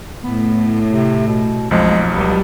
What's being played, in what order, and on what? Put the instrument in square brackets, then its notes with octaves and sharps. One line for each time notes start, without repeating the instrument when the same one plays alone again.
[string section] A2 [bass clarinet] B3
[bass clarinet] C3
B2
[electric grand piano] B1 F2 F3 [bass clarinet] G#3
[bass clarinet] C#2 [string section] F#3 G3